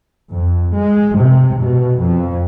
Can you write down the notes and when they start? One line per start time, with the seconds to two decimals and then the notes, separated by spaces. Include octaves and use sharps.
0.32 F2
0.75 G#3
1.19 C3
1.61 B2
2.00 F2